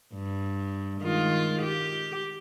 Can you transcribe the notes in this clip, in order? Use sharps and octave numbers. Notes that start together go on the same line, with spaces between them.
G2
D#3 G#3 F4
G4